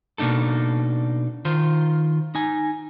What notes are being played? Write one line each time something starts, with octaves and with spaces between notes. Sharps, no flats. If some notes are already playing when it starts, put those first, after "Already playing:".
B2 A#3 D4 D#4 A4
D#3 F4 C5
D#4 G#5